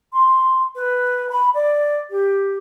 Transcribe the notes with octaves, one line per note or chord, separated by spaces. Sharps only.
C6
B4
B5
D5
G4